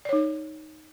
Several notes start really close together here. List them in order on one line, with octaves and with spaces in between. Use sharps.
D5 C#5 D#4